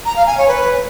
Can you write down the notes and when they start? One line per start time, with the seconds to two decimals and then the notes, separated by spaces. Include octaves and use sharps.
0.05 A#5
0.16 F5
0.27 G#5
0.37 C#5
0.48 B4